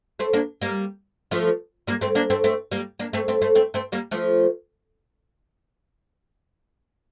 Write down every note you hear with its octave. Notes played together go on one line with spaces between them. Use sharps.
A3 C4
A#3 D4
G3 A#3
F3 A3
G3 A#3
A3 C4
A#3 D4
A3 C4
A3 C4
G3 A#3
A#3 D4
A3 C4
A3 C4
A3 C4
A3 C4
A3 C4
G3 A#3
F3 A3